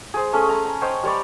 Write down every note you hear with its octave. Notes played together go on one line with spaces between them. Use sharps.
G#4 C5
A3 C#4 G#4
A#5
A#5
C5 C#5 D#5 G5
G3 C#5 D5 B5